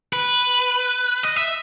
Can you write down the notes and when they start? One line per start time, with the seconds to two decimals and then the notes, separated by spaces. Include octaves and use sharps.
0.13 B4
1.23 D#5
1.36 E5